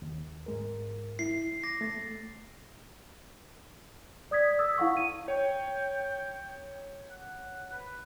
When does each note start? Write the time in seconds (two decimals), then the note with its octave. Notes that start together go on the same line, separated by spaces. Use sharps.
0.02 D#2
0.46 G#2 G#3 A#4
1.19 E4 C7
1.63 D6 A#6
1.81 A3 A6
4.31 D5 D#6 G#6 B6
4.59 D#6 E6 A6
4.78 E4 F5 F#5 C#6
4.97 D#7
5.28 C#5 G5
7.10 F#5
7.73 B4